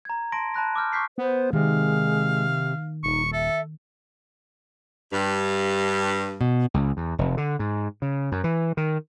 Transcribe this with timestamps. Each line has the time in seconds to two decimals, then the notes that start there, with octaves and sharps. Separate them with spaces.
0.05 A#5 G#6
0.32 A5 C6 A#6 D7
0.54 A5 B5 F#6 A#6
0.76 D6 E6 F6 G6
0.93 C#6 D6 F6 G6 B6 C7
1.18 B3 C5
1.53 C3 D#3 G#3 F5
3.03 D#1 D#4 C#6
3.33 A4 E5
5.13 G2
6.41 B2
6.74 C#2
6.97 E2
7.19 F1
7.37 D3
7.59 G#2
8.02 C#3
8.32 F#2
8.44 E3
8.77 D#3